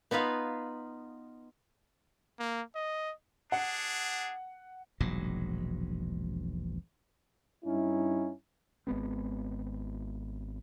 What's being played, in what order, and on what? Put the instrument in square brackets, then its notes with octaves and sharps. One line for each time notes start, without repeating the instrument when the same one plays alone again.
[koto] B3 D#4 F4 B4 F5
[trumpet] A#3
D#5
[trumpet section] D4 G#4 [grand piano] F#5
[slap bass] E1 A#1 G#2 F#3
[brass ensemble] G2 C#4 D#4 E4
[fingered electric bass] G#1 G#3 B3 C4